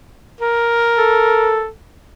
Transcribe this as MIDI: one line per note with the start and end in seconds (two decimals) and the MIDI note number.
0.41 1.62 70
0.98 1.68 69